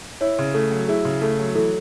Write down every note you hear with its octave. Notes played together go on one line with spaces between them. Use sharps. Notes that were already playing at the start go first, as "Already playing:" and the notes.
E4 C#5
C#3
A3 A4
F#3
E4 G#4
C#3
A3 A4
F#3
E3 A4